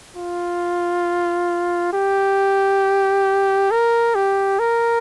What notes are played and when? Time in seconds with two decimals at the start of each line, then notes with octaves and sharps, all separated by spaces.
0.16 F4
1.93 G4
3.71 A#4
4.15 G4
4.59 A#4